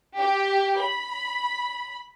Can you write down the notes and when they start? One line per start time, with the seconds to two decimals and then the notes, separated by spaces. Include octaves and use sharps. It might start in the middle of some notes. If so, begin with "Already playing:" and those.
0.19 G4
0.79 B5